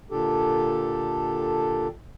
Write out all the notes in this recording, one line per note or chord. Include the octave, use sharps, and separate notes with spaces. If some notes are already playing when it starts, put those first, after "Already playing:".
A#2 D3 D4 G4 A4